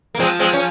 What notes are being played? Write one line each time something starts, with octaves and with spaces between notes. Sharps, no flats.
A#3
F3 G#3 C4
G#3 C4
C#4